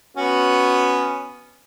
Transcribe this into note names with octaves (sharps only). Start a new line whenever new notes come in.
B3 C#4 F#4